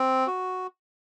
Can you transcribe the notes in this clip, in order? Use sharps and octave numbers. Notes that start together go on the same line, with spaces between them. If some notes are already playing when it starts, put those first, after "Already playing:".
Already playing: C4
F#4